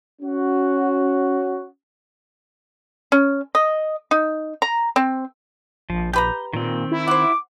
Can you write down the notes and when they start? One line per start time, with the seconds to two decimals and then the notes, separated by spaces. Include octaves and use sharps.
0.22 C#4 F#4
3.12 C#4
3.55 D#5
4.11 D#4
4.62 A#5
4.96 C4
5.90 A#1 F3
6.13 G4 B4 A#5 G6
6.53 A#2 D#3 C4
6.92 E4
7.07 C5 F#5 D6